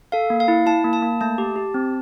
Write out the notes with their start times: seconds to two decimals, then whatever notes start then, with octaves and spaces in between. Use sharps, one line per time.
0.12 A4 F5
0.30 A#3
0.40 F5
0.48 E4
0.66 E4 A5
0.84 A#3
0.93 A5
1.02 A#3
1.21 A3 A5
1.38 G4
1.56 G4
1.74 C4